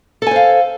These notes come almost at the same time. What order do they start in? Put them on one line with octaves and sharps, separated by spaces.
A4 G#5 C5 F5